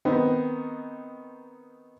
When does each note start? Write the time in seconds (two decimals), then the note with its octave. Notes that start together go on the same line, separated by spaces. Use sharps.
0.05 D#3 B3 C4